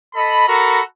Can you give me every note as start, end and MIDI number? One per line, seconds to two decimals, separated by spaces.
0.15 0.45 69
0.15 0.45 75
0.15 0.45 83
0.47 0.80 66
0.47 0.80 69
0.47 0.80 70
0.47 0.80 82
0.47 0.80 83